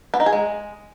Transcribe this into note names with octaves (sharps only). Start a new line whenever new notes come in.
B3
D#4
G#4
G#3